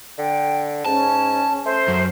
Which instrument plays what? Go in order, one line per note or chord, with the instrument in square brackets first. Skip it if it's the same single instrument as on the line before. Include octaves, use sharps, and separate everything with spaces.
[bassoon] D3 [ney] G5
[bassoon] G#2 [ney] C#4 [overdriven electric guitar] A5
[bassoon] A3 [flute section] C5
[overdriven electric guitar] F#2